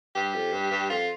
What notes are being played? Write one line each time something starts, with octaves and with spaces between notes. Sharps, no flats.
G2 G4
F2
G2
G2
F2 F4